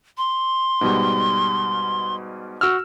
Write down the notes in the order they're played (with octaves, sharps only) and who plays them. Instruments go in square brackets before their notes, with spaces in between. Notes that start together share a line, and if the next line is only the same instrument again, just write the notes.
[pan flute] C6
[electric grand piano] G#2 B2 G3
F#4 E6 F6